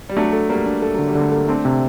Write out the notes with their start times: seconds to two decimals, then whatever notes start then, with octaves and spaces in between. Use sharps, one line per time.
0.09 G3
0.17 F#3 A3 D4
0.33 A4
0.49 G3 A#3 A4
0.66 D4
0.82 A4
0.94 D3 F#3
1.08 G3
1.15 D3
1.21 A3
1.32 A#3 A4
1.48 A3 C4 D4
1.65 C3